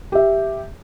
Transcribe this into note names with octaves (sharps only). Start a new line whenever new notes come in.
G4 E5